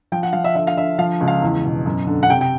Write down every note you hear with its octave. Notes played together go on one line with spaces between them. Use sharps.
F3 G5
F#5
F3 F5
E5
D3 E5
F5
D3 E5
F3 F5
C#2
F5
E2
B2
F#2
D3
F#5
C3 G5
G5